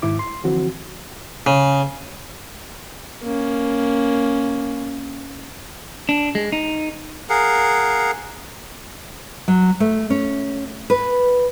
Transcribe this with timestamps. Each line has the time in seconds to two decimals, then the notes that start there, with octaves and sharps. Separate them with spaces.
0.02 G#2 D#3 E4 D6
0.19 C6
0.44 D3 E3 F3 C4 F#4
1.46 C#3
3.23 A#3 C#4
6.09 D4
6.35 G#3
6.52 D#4
7.30 G#4 A#4 F5 F#5
9.48 F#3
9.80 A3
10.10 C#4
10.90 B4